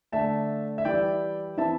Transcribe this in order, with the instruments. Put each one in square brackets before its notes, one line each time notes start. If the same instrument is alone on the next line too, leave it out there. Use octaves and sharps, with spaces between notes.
[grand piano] D3 A3 D4 E5 A5
E5
E3 G3 E4 D5 G5
E3 C4 E4 E5 A5